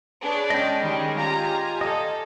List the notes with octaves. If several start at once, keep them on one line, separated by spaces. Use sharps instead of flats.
D4 G#4 B4 C#5
G#3 C#4 D#5 G5
D#3 G3
F4 G4 G#5 A#5
A4 D#5